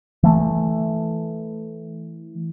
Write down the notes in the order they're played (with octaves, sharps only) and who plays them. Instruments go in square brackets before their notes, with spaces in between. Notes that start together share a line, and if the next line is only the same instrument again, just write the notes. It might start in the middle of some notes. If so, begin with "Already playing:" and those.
[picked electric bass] E3 A3